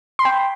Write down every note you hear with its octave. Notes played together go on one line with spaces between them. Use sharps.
G5 B5 C6